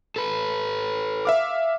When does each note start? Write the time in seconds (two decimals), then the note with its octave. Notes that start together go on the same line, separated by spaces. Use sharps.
0.16 A4 B4
1.25 E5 F5 D6